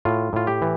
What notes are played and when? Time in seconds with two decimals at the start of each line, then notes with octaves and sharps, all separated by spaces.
0.05 A2 F4
0.33 A2 F4
0.47 G4
0.62 E3